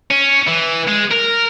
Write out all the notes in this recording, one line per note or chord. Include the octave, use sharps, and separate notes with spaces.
C#4
E3
G#3
A#4